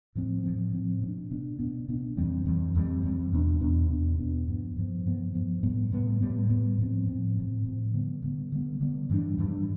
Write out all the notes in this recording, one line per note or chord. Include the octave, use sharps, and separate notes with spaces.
A2 F3 C4
A2 F3 C4
A2 F3 C4
B2 B3 D4
B2 B3 D4
B2 B3 D4
B2 B3 D4
F2 E3 G3 C4
F2 E3 G3 C4
F2 E3 G3 C4
F2 E3 G3 C4
E2 B2 B3 D4
E2 B2 B3 D4
E2 B2 B3 D4
E2 B2 B3 D4
G2 F3 B3
G2 F3 B3
G2 F3 B3
G2 F3 B3
A2 G3 B3
A2 G3 B3
A2 G3 B3
A2 G3 B3
A2 F3 C4
A2 F3 C4
A2 F3 C4
A2 F3 C4
D3 G3 B3
D3 G3 B3
D3 G3 B3
D3 G3 B3
G2 E3 G3 D4
G2 E3 G3 D4